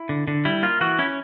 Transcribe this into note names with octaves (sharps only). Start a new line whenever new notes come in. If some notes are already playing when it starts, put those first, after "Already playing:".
Already playing: E4
D3
D3
G3 E4
A#3 F4
E3 F#4
C#4 E4